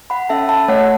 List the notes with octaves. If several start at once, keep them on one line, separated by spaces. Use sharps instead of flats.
F#5 B5
C#4 A4 E5 A5
E5 A5
A3 C#5 F#5